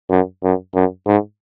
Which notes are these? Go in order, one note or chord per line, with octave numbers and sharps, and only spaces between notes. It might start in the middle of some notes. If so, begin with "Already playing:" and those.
F#2
F#2
F#2
G#2